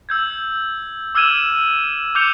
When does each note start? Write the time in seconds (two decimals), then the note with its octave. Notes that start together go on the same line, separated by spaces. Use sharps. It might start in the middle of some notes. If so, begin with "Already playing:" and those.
0.09 E6 G6 G#6
1.15 D6 E6 F6 G#6 D#7 E7
2.15 D6 F6 G6 C#7 F7